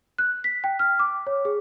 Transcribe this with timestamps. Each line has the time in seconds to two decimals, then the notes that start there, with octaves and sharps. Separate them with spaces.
0.18 F#6
0.44 B6
0.64 G5
0.79 F6
0.99 D6
1.27 C#5
1.45 G#4